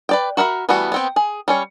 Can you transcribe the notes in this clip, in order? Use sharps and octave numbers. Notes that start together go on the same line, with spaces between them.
B4 D5 G5
F#4 A#4 E5 B5
E3 G3 A3 B3 F#4
B3 C4 G5
G#4
G3 C#4 C#5